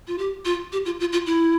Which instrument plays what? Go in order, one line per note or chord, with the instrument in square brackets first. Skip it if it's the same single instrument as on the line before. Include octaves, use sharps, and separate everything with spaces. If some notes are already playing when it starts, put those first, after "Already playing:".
[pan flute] F4
G4
F4
G4
F4
F4
F4
E4